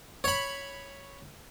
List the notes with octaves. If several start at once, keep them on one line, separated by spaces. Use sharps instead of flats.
C#5 B5